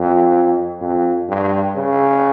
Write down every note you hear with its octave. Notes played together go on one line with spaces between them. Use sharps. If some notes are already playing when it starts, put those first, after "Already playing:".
Already playing: F2
F2
G2
C#3